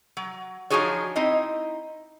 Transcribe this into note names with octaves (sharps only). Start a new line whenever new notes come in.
F#3
F3 D4 D#4 F#4 G#4 C#5
C4 D#4 E4 D#5